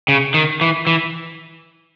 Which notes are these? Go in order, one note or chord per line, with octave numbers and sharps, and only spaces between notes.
C#3
D#3
E3
E3